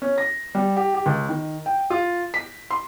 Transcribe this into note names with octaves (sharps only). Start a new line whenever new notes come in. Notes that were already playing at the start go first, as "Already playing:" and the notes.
C#4
A#6
G3
G4
G4
C#2
D#3
G5
F4
B6
C6